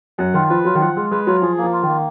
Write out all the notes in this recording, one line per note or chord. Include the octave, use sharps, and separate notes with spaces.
F#2 F#5
D#3 F4
F3 B4
F#3 F4
D#3
F3 F#5
G#3 F4
G#3 B4
F#3 F4
F3 G#4
A#3
F3
F4
D#3
A#3